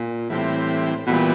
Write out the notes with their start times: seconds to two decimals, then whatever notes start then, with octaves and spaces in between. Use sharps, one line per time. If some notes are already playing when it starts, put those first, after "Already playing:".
Already playing: A#2
0.30 A2 E3 G3 C4
1.06 B2
1.10 A#2 E3 G3 B3